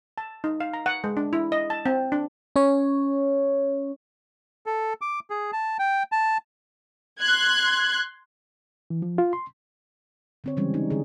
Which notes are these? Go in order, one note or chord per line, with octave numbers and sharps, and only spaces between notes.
A5
D#4
F5
A#5
F#5
G#3
D4
E4
D#5
A5
C4
D4
C#4 C#5
A4
D6
G#4
A5
G5
A5
C6 F#6 G#6
E3
F3
F4
C6
D3 C4 C#5
C#3 E3 G3 G#3 C#4
D#4
D3 G#4